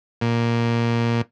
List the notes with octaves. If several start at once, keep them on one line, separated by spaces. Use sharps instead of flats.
A#2